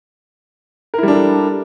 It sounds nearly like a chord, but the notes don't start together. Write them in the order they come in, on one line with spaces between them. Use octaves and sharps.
A#4 E4 G3 D4 A4